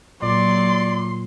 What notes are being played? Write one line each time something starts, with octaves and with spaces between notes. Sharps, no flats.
A#2 F#3 D5 C6